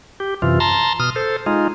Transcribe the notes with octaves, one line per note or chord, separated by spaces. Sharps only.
G4
F#2 C3 E3 F4
A5 A#5 C6
B2 D#6 F6
A4 C5
G#3 D#4 F4